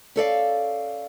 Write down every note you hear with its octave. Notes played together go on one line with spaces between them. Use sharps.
C#4 A4 D5 F5